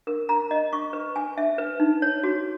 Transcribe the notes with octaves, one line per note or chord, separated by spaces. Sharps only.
A#4
A#5
D#5
C#6
B4
G#5
E5
B4
D#4
C#5
F#4